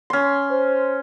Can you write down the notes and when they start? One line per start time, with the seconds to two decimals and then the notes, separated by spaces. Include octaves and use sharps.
0.10 C#4 C6
0.51 C5